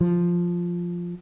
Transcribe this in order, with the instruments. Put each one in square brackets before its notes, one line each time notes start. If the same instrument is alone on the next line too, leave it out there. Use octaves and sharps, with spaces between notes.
[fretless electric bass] F3